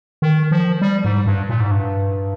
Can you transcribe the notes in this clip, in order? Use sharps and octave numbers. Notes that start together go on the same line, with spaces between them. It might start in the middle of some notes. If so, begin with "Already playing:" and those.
D#3
F3
G3
G#2
G2
A#2
G#2
G2